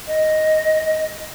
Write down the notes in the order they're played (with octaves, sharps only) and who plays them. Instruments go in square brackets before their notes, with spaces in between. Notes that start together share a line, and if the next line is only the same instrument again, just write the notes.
[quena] D#5